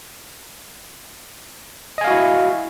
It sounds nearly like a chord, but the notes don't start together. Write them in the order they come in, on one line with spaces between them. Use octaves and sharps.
D#5 G#5 F5 F#4 E4